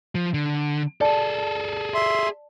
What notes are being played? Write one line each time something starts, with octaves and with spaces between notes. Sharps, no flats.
F3
D3
G#4 A4 D5 A5
E5 C6